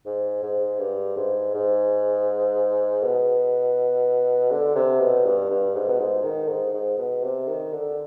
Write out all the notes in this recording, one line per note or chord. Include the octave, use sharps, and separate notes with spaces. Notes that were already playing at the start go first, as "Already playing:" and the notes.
G#2
G#2
G2
G#2
G#2
B2
D3
C3
B2
G2
G2
G#2
B2
G#2
D#3
G#2
G#2
B2
C3
D#3
D3